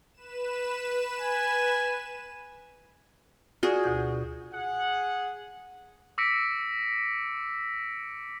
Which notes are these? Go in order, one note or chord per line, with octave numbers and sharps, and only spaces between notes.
B4 E7
G#5
F4 F#4 G#4 D5
D2 B2 G6
G#4 F#5
D6 E6 A#6 B6 C#7 D7